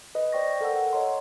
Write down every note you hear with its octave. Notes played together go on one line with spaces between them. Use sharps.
B4 D#5
C5 D5 G5 C#6 A#6
A4 A#4 F#5 E6
F#5
C#5 D#5 A#5 C6